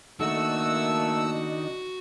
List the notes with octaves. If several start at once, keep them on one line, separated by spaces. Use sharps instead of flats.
D#3 A3 A#3 D4 D#4 F#4 E6